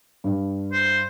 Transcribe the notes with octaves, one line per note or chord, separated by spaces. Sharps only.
G2
C5